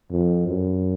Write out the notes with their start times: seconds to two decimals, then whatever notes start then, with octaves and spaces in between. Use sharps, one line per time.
0.11 F2
0.47 F#2